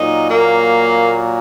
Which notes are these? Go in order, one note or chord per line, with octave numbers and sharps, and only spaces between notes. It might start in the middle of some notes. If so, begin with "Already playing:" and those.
Already playing: A#2 F#3 D#4
A#3